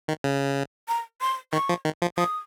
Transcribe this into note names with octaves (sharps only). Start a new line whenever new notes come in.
D#3
C#3
A#5
C6
D#3 C#6
F3
D#3
F3
F3 D#6